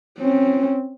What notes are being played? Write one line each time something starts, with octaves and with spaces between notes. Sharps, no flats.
C4 C#4